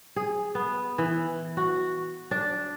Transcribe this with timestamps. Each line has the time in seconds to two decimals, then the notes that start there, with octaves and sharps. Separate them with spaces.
0.16 G#4
0.55 B3
0.98 E3
1.57 F#4
2.31 D4